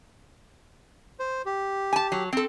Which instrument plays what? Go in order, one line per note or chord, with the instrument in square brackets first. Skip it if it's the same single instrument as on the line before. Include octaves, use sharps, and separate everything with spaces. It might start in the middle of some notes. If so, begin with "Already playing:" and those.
[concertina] C5
G4
[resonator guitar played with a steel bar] G#5 A5
F#3
C4 A4